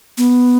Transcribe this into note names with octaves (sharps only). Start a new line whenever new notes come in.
B3